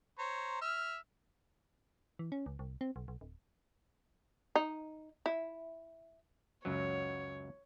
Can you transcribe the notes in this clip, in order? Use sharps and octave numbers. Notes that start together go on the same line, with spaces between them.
C5 C#5 A#5
E5 E6 F6
E3
C#4
C#2
C2
C4
B1
B1
D1
D#4
E4
C#2 F#2 F#3 C#5